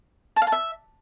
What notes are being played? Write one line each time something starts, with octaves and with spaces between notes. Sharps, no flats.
A5
F5
A5
E5